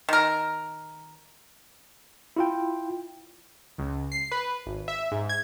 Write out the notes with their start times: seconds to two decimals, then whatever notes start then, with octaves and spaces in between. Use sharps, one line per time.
0.09 D#3 A#4
2.36 E4 F4 G5
3.78 C#2
4.12 C7
4.32 B4
4.66 G#1
4.88 E5
5.12 G#2
5.29 G#6